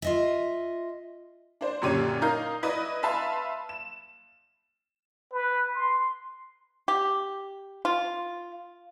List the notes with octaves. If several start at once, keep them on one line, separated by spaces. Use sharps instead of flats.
F4 D#5 E5
D4 C5
F#2 A#2 D3 G4 C#5 D#7
D#4 A#4 F5 G6
E4 B4 D5 D#5
B4 E5 F5 A5 B5 C6
E7
B4
C6
G4
F4